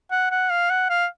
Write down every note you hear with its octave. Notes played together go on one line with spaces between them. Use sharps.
F#5
F#5
F5
F#5
F5